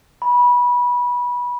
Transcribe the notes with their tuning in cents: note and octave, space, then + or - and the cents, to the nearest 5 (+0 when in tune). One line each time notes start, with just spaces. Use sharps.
B5 -20